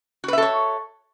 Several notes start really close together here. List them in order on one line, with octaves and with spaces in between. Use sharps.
F#4 B4 E5 A4 C#5